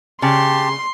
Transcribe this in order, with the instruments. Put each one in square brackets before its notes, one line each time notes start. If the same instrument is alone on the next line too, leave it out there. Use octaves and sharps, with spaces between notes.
[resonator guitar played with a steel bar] C#3 [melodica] G4 A5 [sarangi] C6